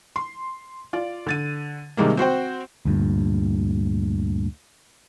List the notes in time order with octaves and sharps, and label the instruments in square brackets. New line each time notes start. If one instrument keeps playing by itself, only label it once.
[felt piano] C6
F4 D5
D3 A6 D#7
C3 D#3 G3 G#3 A#3
C4 F#4 C5 G5
[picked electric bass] D2 G2 A#2